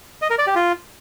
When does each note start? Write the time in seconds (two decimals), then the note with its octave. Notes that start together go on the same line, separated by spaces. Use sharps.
0.22 D#5
0.30 A#4
0.39 D5
0.47 G4
0.55 F4